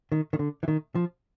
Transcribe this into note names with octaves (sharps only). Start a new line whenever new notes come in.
D#3
D#3
D3
E3
D#3
F3